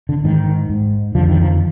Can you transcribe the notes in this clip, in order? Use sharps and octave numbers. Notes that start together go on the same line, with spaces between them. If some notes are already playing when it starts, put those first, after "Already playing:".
D3
G#2 D#3
G#2
F2 D3 F3
D#3
F3